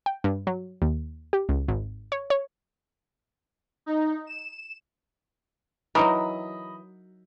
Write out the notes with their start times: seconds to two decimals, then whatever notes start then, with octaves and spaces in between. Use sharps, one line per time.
0.06 G5
0.24 G2
0.47 F#3
0.82 D#2
1.33 G4
1.49 C#2
1.68 G#1
2.12 C#5
2.30 C#5
3.86 D#4
4.27 E7
5.95 E3 F#3 D#4 A#4 D#5 B5 D#6